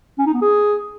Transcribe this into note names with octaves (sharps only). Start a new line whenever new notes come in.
C#4
D#4
B3
G#4